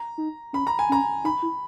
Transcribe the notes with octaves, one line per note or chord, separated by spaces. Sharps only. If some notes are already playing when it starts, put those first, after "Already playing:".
Already playing: A#5
D#4
C#4 B5
A#5
G#5
C#4 A#5
D#4 B5
E4